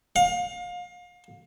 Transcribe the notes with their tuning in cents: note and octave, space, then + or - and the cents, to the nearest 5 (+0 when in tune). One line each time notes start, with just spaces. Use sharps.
F5 +30